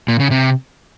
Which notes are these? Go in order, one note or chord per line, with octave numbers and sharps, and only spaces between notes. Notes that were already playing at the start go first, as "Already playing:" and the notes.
A#2
C#3
C3